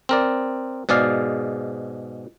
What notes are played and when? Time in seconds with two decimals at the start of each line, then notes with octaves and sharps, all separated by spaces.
0.09 C4 A#4 D5
0.89 G#2 B2 G#4 D5 F5